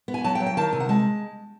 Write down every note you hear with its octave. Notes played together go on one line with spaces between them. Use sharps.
B3
G#5
F#3 A5
G5
F#3
G5
D#3 A5
C3 G#5
F#5
G#3 A5